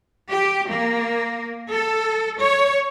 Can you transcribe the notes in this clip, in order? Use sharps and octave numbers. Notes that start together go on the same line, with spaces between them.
G4
A#3
A4
C#5